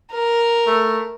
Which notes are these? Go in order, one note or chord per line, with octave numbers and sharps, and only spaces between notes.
A#4
A3